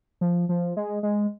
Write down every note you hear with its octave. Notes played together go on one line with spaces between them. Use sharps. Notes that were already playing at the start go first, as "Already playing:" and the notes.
F3
F3
G#3
G#3